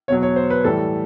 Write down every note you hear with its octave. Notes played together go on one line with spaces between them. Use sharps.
E2 B2 F#3 C#5
C#5
C5
B4
A2 E3 G3 A4